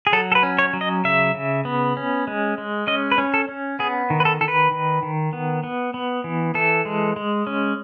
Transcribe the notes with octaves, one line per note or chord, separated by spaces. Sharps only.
G#4
F#3 A4
A4
B4
C#4
C#5
F#3
D#5
C#3 E5
C#3
B3
C#4
G#3
G#3
C#4 D#5
B4
C#4
A4
C#4
B3 G#4
D#3
B4
A4
D#3 A4
B4
D#3
D#3
B3
B3
B3
E3
E3 A4
G#3
G#3
C#4